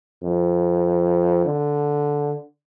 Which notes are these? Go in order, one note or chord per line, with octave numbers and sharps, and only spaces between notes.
F2
D3